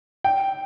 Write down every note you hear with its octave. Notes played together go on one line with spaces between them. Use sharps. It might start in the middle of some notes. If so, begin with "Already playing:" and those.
G5